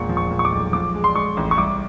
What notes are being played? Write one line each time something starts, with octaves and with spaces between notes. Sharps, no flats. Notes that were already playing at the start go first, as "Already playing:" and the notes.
Already playing: E1 A#2 C#6
F3
C#6
A#2
C#6
D6
B1
F3 D6
G#3
C6
G#3 C#6
A1
C#6
C2 D6